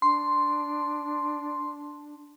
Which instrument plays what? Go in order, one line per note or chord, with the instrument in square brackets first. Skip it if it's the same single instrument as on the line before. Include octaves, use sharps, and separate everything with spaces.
[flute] D4 [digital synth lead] C6